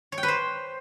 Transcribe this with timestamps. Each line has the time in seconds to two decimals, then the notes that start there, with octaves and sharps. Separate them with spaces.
0.12 C#5
0.18 G5
0.23 B4
0.28 C5